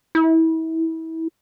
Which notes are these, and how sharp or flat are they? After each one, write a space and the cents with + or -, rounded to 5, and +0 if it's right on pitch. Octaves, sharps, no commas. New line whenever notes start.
E4 -30